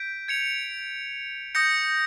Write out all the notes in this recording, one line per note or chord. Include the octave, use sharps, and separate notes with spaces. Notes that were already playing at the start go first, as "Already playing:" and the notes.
Already playing: G6 B6 D7
G#6 C#7 F7
D#6 G6 A#6 C#7